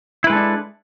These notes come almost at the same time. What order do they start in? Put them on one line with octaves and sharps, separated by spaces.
E4 B4 G#3 A4 D4